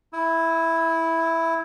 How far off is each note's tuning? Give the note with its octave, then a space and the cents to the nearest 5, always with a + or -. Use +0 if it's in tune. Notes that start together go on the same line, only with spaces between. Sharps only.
E4 +0 E6 -35